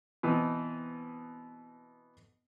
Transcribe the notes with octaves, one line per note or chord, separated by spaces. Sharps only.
B2 E3 B3 C4